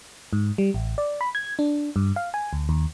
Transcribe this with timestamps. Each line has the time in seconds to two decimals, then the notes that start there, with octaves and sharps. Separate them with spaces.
0.33 G#2
0.58 G3
0.74 A1
0.98 D5
1.21 B5
1.35 G#6
1.59 D4
1.96 G2
2.16 F5
2.34 G#5
2.53 D2
2.69 D#2